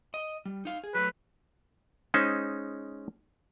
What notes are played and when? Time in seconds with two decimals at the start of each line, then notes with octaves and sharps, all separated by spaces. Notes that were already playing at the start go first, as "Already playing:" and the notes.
0.14 D#5
0.45 G3
0.65 D#4 F5
0.84 G#4
0.95 F#3 A3 B4
2.14 G#3 C#4 D#4 C5